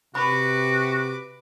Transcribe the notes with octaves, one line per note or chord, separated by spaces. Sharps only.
C3 F#4 B4 B5 D6